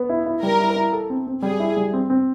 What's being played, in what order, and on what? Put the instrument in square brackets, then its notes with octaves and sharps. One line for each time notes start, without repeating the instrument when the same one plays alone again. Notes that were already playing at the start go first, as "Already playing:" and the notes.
Already playing: [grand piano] B3
E4
E4
[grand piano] G3 [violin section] A#4
[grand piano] E4
E4
A4
C4
C4
[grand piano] G3 [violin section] G#4
[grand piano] E4
G3
C4
C4